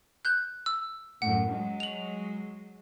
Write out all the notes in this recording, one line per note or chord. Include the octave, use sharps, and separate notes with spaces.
F#6 G6
E6
F#2 A2 F#5
F#3 G#3
F7 F#7